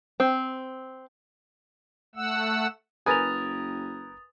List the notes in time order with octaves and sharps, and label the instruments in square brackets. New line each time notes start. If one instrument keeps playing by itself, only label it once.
[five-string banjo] C4
[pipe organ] A3 F#5 E6
[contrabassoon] F#1 [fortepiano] A#4 B4 G#5 [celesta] D#6 A6 F7